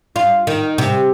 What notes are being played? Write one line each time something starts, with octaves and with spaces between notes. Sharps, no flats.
F4
D#3
C3